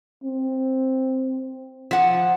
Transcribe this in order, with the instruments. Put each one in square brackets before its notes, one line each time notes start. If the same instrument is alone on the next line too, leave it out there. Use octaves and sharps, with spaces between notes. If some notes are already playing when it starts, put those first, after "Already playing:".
[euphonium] C4
[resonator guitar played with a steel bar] F3 F#5